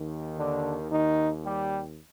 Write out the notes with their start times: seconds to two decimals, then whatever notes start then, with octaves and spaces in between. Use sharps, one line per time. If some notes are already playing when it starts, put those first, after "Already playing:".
Already playing: D#2 D#3
0.37 D3 D4
0.91 D#3 D#4
1.44 G3 G4